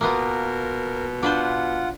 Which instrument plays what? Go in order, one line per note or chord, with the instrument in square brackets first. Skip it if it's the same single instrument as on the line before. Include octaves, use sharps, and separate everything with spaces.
[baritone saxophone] B2 [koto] A#3 B3 F4 [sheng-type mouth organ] A#4
[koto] D4 B4 C5 [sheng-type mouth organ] F4 F#5